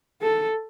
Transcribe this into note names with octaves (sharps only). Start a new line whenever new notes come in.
A4